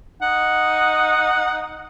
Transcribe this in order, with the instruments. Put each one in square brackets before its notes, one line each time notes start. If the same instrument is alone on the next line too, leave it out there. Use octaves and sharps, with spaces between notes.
[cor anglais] D#4 [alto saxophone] F#5